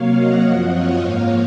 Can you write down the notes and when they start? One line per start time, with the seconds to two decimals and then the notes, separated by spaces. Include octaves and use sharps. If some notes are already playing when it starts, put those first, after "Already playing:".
Already playing: C3 F#3 A#3 C#5 F5
0.16 D#5 F#5
0.44 F#2 F3 C4 D#5 F#5
0.72 C#5 F5
1.00 G#2 F3 A#3